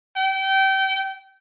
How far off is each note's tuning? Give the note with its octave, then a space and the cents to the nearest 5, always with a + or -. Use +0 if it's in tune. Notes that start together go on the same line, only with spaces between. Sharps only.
G5 -30